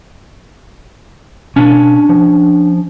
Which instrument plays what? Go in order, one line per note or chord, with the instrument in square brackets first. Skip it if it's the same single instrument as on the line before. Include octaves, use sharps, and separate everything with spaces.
[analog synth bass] B2 [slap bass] C#4 D4
[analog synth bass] F3